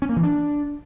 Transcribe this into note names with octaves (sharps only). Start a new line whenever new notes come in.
C#4
A#3
E3
D4